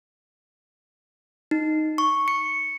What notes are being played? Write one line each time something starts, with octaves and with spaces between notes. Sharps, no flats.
D#4
C#6
C#7